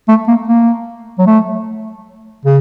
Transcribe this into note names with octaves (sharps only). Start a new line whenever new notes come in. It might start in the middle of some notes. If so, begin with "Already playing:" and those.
A3
A#3
A#3
F#3
A3
C#3